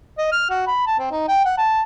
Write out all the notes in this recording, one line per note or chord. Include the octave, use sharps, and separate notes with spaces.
D#5
F6
F#4
B5
A5
C4
D#4
G5
F#5
A5